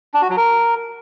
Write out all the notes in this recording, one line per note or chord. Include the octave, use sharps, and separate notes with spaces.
D4
F#4
F#3
A#4